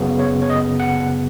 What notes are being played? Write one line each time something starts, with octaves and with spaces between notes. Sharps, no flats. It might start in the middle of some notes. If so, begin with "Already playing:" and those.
Already playing: F#2 C#3 F#3 B3
C#5
C#5
D#5
F#5